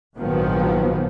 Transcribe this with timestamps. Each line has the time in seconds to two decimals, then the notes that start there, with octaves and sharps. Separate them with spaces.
0.17 A#1 G#2 D#3 F3 F#3 B3